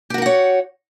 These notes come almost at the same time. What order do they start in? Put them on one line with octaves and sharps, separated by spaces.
G4 F#4 A#4 F#5 C#5